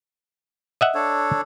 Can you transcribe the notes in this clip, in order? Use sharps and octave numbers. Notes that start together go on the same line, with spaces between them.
D#5 E5 F#5
D4 A4 C#5